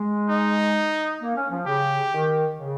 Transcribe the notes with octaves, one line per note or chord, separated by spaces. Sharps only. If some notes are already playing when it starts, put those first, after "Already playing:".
Already playing: G#3
D#4
A#3
C#4
F3
C#3 G4
D#3
C#3